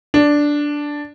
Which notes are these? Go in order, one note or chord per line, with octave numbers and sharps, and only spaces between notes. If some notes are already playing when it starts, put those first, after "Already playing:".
D4